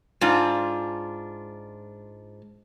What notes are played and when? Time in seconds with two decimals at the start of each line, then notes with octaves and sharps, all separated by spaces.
0.21 G#2 D4 F4